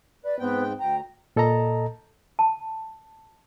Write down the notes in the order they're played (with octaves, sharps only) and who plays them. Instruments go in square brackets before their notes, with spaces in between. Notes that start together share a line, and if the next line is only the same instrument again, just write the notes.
[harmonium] B4 [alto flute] D5
[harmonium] G#2 C4 G5 [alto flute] B3
[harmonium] D2 A#5 [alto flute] G5
[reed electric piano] A#2 A4 D#5 A5 A#5
[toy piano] A5